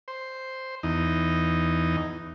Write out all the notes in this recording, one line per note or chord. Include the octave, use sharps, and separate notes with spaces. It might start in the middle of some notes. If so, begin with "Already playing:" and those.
C5
E2 D#4